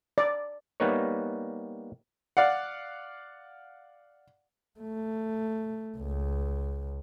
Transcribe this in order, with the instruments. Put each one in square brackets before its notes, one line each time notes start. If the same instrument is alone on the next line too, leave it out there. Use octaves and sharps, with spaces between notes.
[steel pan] D5
[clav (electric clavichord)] G3 A#3 B3 D#4 B4 C#5
[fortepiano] D5 F5 F#5
[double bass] A3
C#2